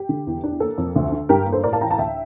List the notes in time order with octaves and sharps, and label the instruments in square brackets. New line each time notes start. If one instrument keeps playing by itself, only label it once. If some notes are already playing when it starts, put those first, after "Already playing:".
Already playing: [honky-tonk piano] G4
D3
E2
D4
A#3 A4
F2
D2
D3
G2 G4 A#4
A#3
A4 C5
A2 A#4 D5
F5 A5
E3 G5 A#5
F5 A5
D2 E5 G5